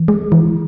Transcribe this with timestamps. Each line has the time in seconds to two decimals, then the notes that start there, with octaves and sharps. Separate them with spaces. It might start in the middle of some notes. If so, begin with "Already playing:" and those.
Already playing: E3
0.08 G#3
0.32 E3